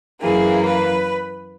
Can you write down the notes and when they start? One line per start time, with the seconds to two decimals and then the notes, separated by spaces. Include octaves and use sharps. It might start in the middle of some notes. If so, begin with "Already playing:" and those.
0.21 F#2 E3 A#3 G#4
0.66 B4